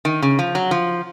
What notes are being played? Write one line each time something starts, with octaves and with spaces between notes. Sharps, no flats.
D#3
C#3
F3
F#3
F3